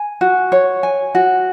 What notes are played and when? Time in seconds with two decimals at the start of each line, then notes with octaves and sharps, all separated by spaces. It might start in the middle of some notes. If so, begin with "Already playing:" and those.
Already playing: G#5
0.21 F#4
0.52 C#5
0.83 G#5
1.15 F#4